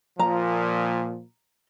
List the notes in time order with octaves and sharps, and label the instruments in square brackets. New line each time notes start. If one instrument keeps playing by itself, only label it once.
[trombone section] A#2 F3 [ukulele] A#5